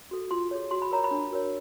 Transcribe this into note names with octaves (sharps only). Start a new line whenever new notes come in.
F#4 A4
F4 C6
G#4 C#5
F#4 C6
B5
A#4 C#5 A#5
B5
D4
F#4 A#4 C#5